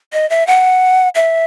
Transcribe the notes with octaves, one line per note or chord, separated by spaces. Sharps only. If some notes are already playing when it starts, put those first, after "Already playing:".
D#5
E5
F#5
E5